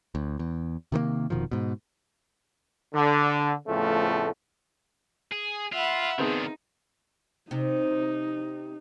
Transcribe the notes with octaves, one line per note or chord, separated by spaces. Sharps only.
D2
E2
C3 D#3 G3 A#3
F1 B2 D#3 F3
G#2 B2
D3
F2 A2 C#3 F3 A3 B3
G#4
F4 E5 F#5 B5
D#3 B3 C4 D4 D#4 G#4
C3 D#4